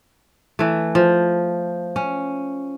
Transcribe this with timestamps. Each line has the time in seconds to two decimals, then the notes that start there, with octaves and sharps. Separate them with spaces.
0.59 E3 A3
0.95 F3
1.96 C#4